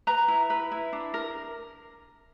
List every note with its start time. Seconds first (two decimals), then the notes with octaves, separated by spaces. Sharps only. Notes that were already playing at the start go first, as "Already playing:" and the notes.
0.07 B4 A#5
0.28 E4
0.50 B4
0.72 E4
0.93 D4
1.14 A#4